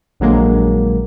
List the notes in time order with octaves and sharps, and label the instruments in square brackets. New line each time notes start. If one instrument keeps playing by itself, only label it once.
[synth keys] A#1 D3 F#3 G#3 A#3